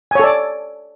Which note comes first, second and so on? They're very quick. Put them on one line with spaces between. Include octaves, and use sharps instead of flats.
G#5 C#5 A4 D5